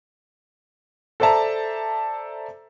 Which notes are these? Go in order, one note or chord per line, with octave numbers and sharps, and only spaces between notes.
A4 C5 D5 E5 A5 A#5